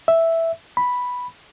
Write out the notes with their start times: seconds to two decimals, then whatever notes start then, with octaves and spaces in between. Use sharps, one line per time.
0.08 E5
0.77 B5